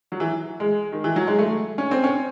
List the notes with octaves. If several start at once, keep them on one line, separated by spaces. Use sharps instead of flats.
F#3
E3
G#3
D#3
E3
F#3
G#3
A3
C#4
C4
C#4